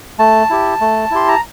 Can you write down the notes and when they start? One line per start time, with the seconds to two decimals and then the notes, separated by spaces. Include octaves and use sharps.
0.19 A3 A5
0.50 E4 G4
0.81 A3
1.11 E4 G4 C6
1.28 A#5